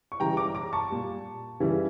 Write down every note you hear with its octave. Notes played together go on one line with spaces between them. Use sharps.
C#6
C#3 E3 G3 G5 A#5
A#5 D6
A#5 D6
A5 C#6
A#2 G3
C#3 E3 G3